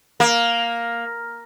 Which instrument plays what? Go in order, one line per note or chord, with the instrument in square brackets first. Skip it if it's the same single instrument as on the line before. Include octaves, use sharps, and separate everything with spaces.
[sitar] A#3